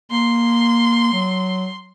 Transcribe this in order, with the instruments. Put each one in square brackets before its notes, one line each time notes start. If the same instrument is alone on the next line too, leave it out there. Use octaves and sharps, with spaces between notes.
[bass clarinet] A#3 [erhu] C6
[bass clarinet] F#3